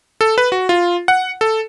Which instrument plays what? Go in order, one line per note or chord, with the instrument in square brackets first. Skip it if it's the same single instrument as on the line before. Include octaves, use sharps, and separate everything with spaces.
[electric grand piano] A4
B4
F#4
F4
F#5
A4